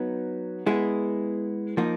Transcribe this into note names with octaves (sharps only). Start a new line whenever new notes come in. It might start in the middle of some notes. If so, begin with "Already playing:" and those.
Already playing: F#3 B3 D#4
G#3 B3 E4 G#4
F3 A#3 D#4